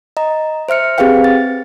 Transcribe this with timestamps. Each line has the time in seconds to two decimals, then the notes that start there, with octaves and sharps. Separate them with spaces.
0.17 D#5 A#5
0.69 C5 E5 F6 C#7
0.98 C4 G4 G#4 B4 F5 G5
1.24 A6